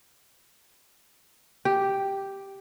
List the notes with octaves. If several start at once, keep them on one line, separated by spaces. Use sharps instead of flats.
G4